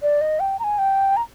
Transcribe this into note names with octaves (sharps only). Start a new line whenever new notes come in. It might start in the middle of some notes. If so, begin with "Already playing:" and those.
D5
D#5
G5
A#5
G#5
G5
A#5